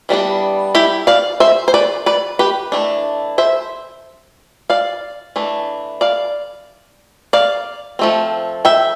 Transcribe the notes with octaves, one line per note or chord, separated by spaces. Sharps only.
E3 G3 B3 D4
E4 G4
D5 F5
C5 E5
C5
B4 D5
B4 D5
G4 B4
E3 A3 D4
C5 E5
D5 F5
E3 A3 D4
D5 F5
D5 F5
F3 A3 C4
E5 G5